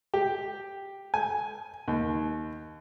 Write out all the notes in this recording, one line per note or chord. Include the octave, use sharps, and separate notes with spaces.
G4
G#5
D#2